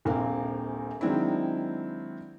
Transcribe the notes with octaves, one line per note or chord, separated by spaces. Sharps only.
D#1 A#1 A#3 C4 F5
D#3 F#3 G#3 C4 D4 E4